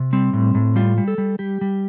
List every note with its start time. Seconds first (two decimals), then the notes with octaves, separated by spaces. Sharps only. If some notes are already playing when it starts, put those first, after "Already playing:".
Already playing: C3
0.13 G3 C4
0.33 A2
0.55 A2
0.76 G3 F4
0.98 G3
1.08 A4
1.18 G3
1.39 G3 G4
1.61 G3